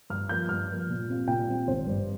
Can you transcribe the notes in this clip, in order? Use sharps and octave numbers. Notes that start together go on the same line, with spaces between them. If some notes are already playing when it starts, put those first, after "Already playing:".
G2 F6
F3 A#3 G6
G2 F6
F3 A#3
A#2
G3 C4 F4
A#2 G5
G3 C4 F4
G#1 C5
G2 G3